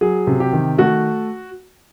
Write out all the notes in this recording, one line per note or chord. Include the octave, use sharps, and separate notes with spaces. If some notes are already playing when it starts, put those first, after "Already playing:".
F#3 G#4
C3
G4
D#3
A3 F#4